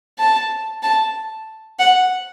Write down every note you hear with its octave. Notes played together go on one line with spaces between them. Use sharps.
A5
A5
F#5